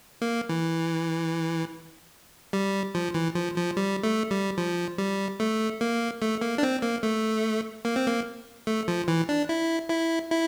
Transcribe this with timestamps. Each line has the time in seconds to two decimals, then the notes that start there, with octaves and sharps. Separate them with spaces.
0.22 A#3
0.49 E3
2.53 G3
2.95 F3
3.14 E3
3.35 F3
3.56 F3
3.77 G3
4.03 A3
4.31 G3
4.58 F3
4.98 G3
5.40 A3
5.81 A#3
6.22 A3
6.41 A#3
6.58 D4
6.63 C4
6.82 A#3
7.03 A3
7.85 A#3
7.96 C4
8.07 A#3
8.67 A3
8.88 F3
9.08 E3
9.29 D4
9.49 E4
9.90 E4
10.31 E4